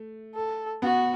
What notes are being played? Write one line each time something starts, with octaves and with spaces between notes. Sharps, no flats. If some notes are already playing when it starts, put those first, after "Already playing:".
Already playing: A3
A4
B3 F#4